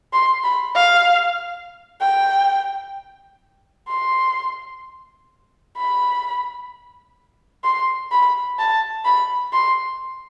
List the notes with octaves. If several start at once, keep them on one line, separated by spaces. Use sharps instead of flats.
C6
B5
F5
G5
C6
B5
C6
B5
A5
B5
C6